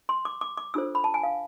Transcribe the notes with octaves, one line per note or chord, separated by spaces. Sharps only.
C6
D6
D6
D6
D4 F4 A4 C5 E6
B5
A5
G#5
F5